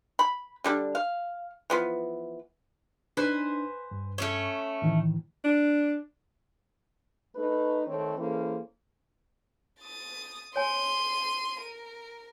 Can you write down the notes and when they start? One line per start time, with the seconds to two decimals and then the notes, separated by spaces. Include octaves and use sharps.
0.19 B5
0.64 D3 G3 D4
0.95 F5
1.70 E3 F3 B3
3.17 D4 D#4 B4 C5 G#5
3.91 G2
4.18 A3 C#4 C#5
4.82 A2 D#3 E3
5.44 D4
7.36 A3 D#4 B4
7.87 D#3 A3 C4 C#5
8.18 E3 A#3 C#4 G#4 A4 C5
9.80 D#6 A6
10.56 C#5 G#5 C6 D#7
11.61 A#4